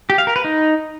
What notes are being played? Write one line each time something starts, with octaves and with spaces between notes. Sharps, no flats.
G4
F5
A#4
B4
D#4